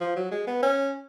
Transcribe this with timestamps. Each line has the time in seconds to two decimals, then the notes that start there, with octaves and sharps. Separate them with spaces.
0.01 F3
0.16 F#3
0.31 G#3
0.47 B3
0.63 C#4